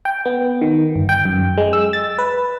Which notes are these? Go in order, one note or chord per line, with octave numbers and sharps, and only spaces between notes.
G5
B3
D#3
G1
G5
F#2
G#3
E6
A6
B4